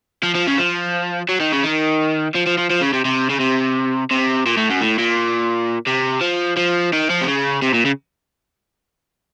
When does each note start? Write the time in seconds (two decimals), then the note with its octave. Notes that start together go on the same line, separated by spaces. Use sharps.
0.23 F3
0.35 F3
0.47 C#3
0.58 F3
1.29 F#3
1.41 D#3
1.53 C#3
1.64 D#3
2.35 F3
2.46 F3
2.58 F3
2.70 F3
2.81 C#3
2.93 C3
3.05 C3
3.30 C#3
3.40 C3
4.11 C3
4.46 A#2
4.57 A2
4.70 F#2
4.81 A2
4.99 A#2
5.87 C3
6.21 F3
6.57 F3
6.93 D#3
7.10 F3
7.21 C3
7.27 C#3
7.62 C3
7.74 A#2
7.85 C#3